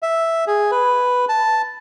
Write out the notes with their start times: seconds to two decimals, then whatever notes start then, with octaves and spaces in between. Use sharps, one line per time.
0.02 E5
0.47 G#4
0.71 B4
1.29 A5